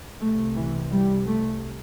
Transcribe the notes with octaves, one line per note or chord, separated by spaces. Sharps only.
C2 C3 A3
E3
G3
A3